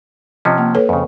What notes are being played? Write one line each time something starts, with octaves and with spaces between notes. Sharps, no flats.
C3 F3 C#4 D#5
A#3
A4 B4 C#5
F2 C#3